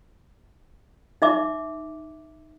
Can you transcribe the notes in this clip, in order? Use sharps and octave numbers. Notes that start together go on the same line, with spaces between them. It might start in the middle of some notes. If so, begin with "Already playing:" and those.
D#4 E5 D6